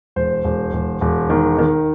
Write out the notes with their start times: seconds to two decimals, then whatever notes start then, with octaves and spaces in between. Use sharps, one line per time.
0.16 E1 C5
0.44 E1
0.73 E1
1.01 E1
1.30 D#3
1.58 D#3